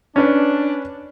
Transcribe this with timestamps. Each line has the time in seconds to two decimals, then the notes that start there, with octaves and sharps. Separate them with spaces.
0.16 C#4 D4 B4